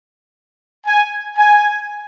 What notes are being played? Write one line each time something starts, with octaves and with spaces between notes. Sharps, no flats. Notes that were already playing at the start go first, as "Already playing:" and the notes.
G#5
G#5